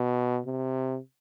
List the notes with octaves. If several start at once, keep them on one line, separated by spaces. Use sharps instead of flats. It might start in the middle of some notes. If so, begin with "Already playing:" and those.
Already playing: B2
C3